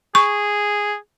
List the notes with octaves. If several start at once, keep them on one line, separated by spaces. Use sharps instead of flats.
G#4 C#6